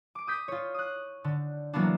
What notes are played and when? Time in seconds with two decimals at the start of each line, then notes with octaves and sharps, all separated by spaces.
0.15 D6 D7
0.27 D#6 G6 B6
0.48 F4 C#5
0.74 D#6 F#6
1.24 D3
1.73 E3 F#3 A#3 B3 D4